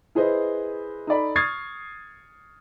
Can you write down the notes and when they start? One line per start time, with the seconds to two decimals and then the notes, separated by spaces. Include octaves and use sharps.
0.15 E4 G#4 B4 C5 D#5
1.07 D#4 A4 D5 B5
1.36 C#6 D#6 F6 G#6 A6 C7